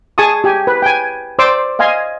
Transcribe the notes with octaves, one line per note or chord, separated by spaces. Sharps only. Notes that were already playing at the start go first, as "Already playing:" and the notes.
G#4 G#5 A5 C#6 D#6
G4 G#5
B4
G5 G#5
C5 D5 C6 D6 E6
D#5 F5 G#5 C6 D#6